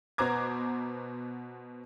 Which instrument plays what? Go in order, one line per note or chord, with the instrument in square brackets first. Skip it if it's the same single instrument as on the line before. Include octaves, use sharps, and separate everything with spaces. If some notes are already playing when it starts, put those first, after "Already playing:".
[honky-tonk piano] B2 B3 C5 A#5 D6 G#6